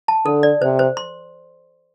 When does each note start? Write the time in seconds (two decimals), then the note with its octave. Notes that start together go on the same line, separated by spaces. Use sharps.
0.08 A5
0.26 D3 A4
0.43 D5
0.62 C3 C5
0.79 C5
0.97 C6